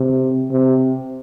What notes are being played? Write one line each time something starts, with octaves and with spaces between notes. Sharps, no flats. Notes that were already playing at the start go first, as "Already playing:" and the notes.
Already playing: C3
C3